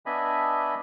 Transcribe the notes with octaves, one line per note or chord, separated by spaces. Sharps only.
B3 D4 D#5 E5 G#5 B5